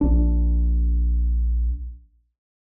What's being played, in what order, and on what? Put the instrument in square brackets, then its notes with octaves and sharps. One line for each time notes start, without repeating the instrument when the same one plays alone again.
[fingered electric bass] A#1 D4